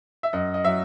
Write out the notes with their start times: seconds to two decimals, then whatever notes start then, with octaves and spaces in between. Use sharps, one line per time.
0.23 E5
0.33 F#2 D#5
0.54 D#5
0.64 F#3 E5